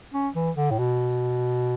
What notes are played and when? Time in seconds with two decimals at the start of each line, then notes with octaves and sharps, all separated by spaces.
0.14 C#4
0.35 E3
0.57 D3
0.71 A2
0.79 B2